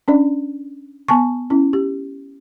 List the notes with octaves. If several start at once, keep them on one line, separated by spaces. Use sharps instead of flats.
C#4 D4 D5
B3 G#5 A5 C#6
C#4 E4
G4